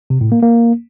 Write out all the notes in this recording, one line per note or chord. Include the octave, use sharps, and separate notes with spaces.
C3
A2
A#3
A#3